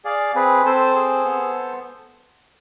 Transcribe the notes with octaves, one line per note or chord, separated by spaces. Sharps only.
G#4 D5 F5
C4 G#4 B4
C4 A4 C5
G#4
B3